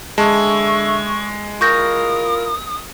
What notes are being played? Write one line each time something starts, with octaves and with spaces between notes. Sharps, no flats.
D3 G#3 E5 A5 C#6
E4 F4 A#4 C#6 D#6 G6 A#6